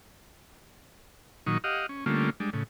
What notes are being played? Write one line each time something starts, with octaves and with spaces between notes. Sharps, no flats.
A#2 D#3 F#3 D#4 C#6
G4 D#5 F5 F#5
C#4
D3 G3 A3 A#3 C#4 F4
G3 G#3 D4
A2 C#3